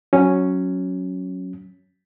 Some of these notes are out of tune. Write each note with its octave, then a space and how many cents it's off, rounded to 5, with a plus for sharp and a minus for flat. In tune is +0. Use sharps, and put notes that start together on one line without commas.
F#3 +0 C#4 +0